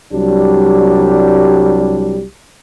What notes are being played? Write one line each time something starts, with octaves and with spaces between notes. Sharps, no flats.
C2 F#3 G3 D4 G4